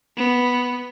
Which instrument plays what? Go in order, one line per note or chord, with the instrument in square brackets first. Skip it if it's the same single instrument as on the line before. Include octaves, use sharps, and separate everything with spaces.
[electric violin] B3